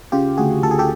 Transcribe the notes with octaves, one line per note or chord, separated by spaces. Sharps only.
C#3 F4 G4
D2 F#4 G#4
D2 A4
G#4
G4 A4